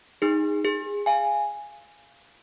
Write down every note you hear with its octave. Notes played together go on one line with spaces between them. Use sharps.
D#4 G#4
G#4
F5 G#5